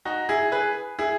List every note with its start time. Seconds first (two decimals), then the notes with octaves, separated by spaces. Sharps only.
0.05 D#4 F#4
0.29 E4 G#4
0.52 G#4 B4
0.99 E4 G#4